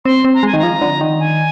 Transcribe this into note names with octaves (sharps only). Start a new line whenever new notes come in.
C4 C6
C4
A#5
G#3
G#5
D#3
F3 A#5
D3
D#3
G#5